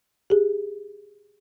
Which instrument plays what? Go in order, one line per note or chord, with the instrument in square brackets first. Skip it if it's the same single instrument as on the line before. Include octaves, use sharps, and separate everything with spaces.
[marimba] G4 G#4